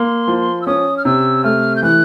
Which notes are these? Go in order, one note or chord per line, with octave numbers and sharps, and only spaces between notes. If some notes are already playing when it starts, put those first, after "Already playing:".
Already playing: A#3 C6
F3
E6
C#4 D#6
F6
C3 E6
A3 F6
G6
E3 F#6